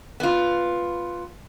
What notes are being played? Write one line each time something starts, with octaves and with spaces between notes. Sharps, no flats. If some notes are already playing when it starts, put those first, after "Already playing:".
B3 F4